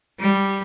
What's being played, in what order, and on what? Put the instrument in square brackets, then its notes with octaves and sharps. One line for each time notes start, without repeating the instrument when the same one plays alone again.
[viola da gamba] G3